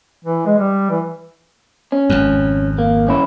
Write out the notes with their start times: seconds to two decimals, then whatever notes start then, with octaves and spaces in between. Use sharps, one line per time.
0.25 E3
0.46 G#3
0.58 G3
0.90 E3
1.92 C#4
2.09 G#1 F2
2.78 A#3
3.07 C2 C#4 E4